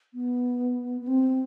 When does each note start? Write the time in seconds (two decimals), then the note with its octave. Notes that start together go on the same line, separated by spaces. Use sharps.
0.14 B3
1.01 B3
1.08 C4